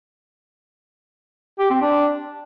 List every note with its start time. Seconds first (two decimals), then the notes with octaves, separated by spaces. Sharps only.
1.59 G4
1.70 C4
1.82 D4